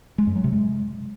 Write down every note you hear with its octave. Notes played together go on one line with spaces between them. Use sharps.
G#3
F#2
F#3
C3
G#3